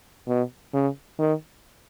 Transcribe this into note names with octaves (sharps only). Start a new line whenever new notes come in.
B2
C#3
D#3